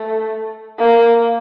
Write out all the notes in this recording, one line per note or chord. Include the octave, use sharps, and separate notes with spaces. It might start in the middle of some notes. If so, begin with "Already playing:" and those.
Already playing: A3
A#3